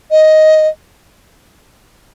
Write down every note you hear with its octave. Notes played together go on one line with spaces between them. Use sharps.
D#5